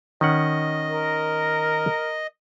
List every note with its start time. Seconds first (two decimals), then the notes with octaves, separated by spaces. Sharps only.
0.21 D#3 C#4 D#5 F#5
0.92 A#4